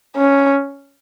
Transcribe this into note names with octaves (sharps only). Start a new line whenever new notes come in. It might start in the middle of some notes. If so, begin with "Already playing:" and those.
C#4